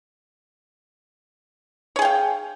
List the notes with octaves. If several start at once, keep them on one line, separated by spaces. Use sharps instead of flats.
G#4 C#5 F5 G5